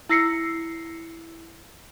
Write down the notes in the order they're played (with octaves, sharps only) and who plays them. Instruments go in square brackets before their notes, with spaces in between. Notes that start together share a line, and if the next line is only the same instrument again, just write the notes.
[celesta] E4 E6 A#6 C7 C#7